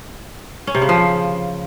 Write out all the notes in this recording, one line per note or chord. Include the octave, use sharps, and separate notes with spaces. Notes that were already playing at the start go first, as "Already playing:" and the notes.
C#4
C3
C#3
F3